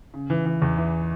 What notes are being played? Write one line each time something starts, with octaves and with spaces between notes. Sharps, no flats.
C#3
E3
E3
E2
E3